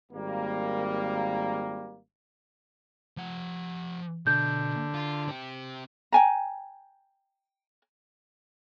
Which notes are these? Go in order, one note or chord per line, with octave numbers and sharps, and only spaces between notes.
G#1 G3 A#3
F3 F#5
B2 D3 G6
F4
C4 G4
G5 G#5 A#5